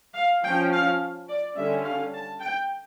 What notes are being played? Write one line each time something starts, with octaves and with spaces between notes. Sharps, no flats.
F5
F3 C#4 G5
F5
D5
D3 G3 C#4 E5
F5
A5
G5